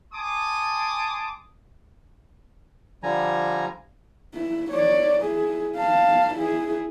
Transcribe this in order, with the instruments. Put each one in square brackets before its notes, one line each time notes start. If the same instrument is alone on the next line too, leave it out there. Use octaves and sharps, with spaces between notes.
[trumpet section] G#5 A5 C6 D6 D#6
[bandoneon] D3 F3 G3 G#5 A#5
[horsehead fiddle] E4
C#5 D5
E4 G#4
F5 A5
E4 G#4